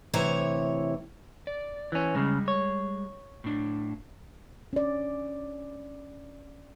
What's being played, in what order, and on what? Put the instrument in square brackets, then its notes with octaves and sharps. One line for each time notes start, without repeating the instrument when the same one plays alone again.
[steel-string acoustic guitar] D2 C3 E3 E4 C#5 A#5
[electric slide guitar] D5
[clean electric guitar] E3 C#4
[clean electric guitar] C#2 C#3 [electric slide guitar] G3 G#3
[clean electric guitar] C#5
[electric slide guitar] A2 D4
[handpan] C#4 D5